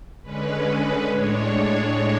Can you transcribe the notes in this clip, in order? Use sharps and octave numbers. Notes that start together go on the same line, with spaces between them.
D3 G#3 C#4 B4
A2 G#3 D4 C#5